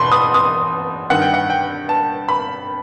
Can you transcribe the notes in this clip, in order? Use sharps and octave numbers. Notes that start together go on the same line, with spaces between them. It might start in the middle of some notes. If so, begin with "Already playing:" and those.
Already playing: E2 B2 B5 C6
D#6
D#6
G2 D#3 F#5
G5
F#5
G5
A5
B5